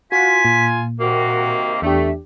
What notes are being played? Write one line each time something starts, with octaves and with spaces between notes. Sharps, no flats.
F4 F#4 F#5 G#5 B6
A#2
C3 D#3 A#3 F#4
E2 A3 D4 G4 E5